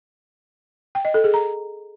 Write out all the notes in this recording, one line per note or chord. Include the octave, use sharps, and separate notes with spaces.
G5
D#5
A4
G#4
A#5